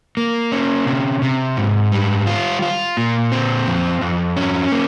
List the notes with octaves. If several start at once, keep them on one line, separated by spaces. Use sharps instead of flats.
A#3
C#4
C3
C3
G#2
G3
F4
F4
A#2
C4
F2
F2
C#4
A#3